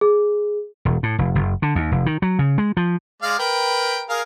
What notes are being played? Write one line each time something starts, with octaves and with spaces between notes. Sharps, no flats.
G#4
E1
A2
F1
F#1
D3
D#2
F1
D#3
F#3
C#3
G#3
F3
G#3 D5 F5
A#4 B4 G5
G#4 A#4 F5